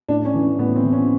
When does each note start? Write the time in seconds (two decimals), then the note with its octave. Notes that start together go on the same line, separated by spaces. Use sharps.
0.08 A2 D4
0.25 C#4
0.34 E3
0.59 A2 B3
0.76 C4
0.83 E3
0.93 C#4